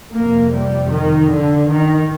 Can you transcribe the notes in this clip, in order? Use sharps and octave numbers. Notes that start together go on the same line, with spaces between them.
F2 C3 A#3
G3
D#3
D3
D#3